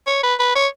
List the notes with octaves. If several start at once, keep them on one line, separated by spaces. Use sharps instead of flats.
C#5
B4
B4
C#5